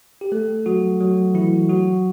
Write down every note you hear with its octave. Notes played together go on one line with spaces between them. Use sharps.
G4
A3 A4
F#3 F#4
F#3 F#4
E3 E4
F#3 F#4